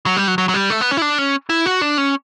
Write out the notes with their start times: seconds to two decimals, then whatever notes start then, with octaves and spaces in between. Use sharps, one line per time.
0.06 F#3
0.16 G3
0.28 F#3
0.38 F#3
0.49 F#3
0.54 G3
0.70 A3
0.81 B3
0.91 C#4
0.97 E4
1.02 D4
1.18 C#4
1.50 E4
1.66 F#4
1.81 D4
1.98 C#4